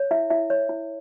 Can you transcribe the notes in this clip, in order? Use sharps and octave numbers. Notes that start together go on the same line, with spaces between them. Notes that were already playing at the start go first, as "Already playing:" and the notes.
Already playing: C#5
E4 E5
E4 E5
C#5
E4